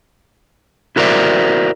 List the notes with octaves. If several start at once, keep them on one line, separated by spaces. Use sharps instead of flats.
E4 F#4 A#4 C5 D5 E5